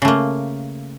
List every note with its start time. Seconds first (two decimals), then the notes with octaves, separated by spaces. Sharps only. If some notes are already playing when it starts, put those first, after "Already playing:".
0.02 C#3
0.05 A3
0.08 A#3